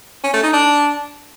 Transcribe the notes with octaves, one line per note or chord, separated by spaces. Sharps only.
C#4
A3
D#4
D4